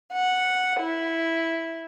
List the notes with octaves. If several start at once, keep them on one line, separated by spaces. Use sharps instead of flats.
F#5
E4